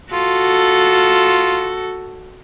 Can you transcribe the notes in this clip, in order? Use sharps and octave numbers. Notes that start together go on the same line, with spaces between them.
F4 F#4 A4